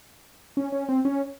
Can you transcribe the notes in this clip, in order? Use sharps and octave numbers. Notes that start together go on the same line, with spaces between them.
C#4
C#4
C4
C#4